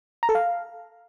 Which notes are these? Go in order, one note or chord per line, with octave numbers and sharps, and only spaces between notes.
A#5
A4
F5